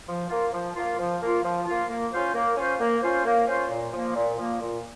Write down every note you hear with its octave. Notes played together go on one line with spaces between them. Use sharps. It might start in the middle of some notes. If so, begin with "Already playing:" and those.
F3
A#3 F4
F3
A#3 F4
F3
A#3 F4
F3
A#3 F4
A#3
C#4 F4 C5
A#3
C#4 F4 C5
A#3
C#4 F4 C5
A#3
C#4 F4 C5
A#2
F3 A#3
A#2
F3 A#3
A#2